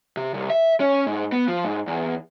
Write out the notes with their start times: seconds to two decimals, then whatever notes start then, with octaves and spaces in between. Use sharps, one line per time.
0.17 C3
0.34 C2
0.50 E5
0.80 C#4
1.07 G#2
1.32 B3
1.48 F3
1.65 G#2
1.87 E2